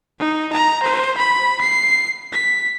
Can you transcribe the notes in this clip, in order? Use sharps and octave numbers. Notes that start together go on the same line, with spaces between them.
D#4
A#5
C5
B5
C7
B6